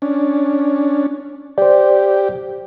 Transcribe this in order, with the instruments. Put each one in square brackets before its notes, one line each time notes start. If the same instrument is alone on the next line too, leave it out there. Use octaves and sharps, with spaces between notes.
[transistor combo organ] C#4 D4
[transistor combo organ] G4 [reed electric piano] C5 D5